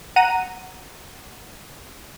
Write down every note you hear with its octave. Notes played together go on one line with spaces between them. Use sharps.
F#5 A#5 D#7